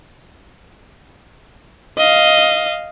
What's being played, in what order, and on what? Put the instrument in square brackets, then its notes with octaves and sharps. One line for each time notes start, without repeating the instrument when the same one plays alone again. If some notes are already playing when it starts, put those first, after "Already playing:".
[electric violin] D#5 F5